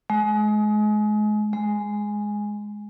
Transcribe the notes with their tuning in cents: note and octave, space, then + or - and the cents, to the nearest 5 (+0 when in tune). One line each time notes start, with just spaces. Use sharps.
G#3 +30
G#3 +0